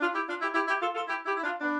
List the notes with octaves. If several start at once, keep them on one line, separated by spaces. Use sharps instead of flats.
D4 F4
E4 G4
D4 F4
E4 G4
E4 G4
E4 G4
F4 A4
F4 A4
E4 G4
E4 G4
E4
D4 F4
B3 D4